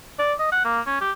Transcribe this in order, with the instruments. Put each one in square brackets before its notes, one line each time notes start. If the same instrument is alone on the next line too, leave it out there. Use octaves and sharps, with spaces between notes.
[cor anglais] D5
D#5
F#5
A#3
C#4
G4